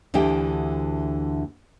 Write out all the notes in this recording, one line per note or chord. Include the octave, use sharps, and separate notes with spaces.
D2 D3 E3 G4 G5